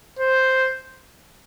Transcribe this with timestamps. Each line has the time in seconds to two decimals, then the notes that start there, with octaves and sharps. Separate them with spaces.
0.19 C5